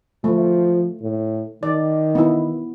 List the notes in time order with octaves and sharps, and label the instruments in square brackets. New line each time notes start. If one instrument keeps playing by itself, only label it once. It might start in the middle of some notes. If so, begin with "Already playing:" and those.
[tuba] F3 [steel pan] A3
[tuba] A2
[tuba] D#3 [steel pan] D5
[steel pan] B3 E4